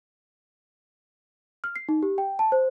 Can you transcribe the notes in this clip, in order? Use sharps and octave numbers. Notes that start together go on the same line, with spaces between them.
F6
C7
D#4
G4
G5
A5
C5